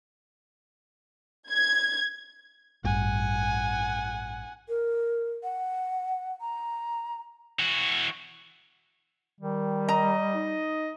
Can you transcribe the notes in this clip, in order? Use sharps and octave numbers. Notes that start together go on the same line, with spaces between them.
G#6
A1 G2 F#5 G#5
A#4
F#5
A#5
E3 F#4
D#3 G3
D#5 A#5
D#4